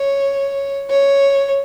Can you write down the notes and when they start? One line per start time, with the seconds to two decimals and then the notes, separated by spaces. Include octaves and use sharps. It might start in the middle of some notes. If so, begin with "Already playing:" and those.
Already playing: C#5
0.90 C#5